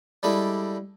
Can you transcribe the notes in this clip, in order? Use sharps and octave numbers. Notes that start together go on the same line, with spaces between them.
G3 G#3 D4 E4 A4